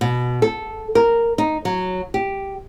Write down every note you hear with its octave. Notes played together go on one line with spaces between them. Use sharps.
B2
A4
A#4
D#4
F#3
G4